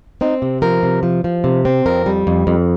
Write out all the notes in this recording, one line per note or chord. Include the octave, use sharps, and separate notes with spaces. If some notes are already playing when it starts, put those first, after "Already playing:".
C4 D#4
C3
F3 A#4
C3
F3
F3
C3
C4
F2 A#4
G3
F2
F2